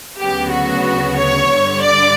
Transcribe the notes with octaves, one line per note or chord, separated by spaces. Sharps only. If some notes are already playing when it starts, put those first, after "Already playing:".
D2 C#3 F#3 B3 G4
F#4
C#5
G2 D3 G3
D5